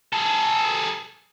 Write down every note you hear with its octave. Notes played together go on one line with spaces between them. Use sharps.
G#4 A4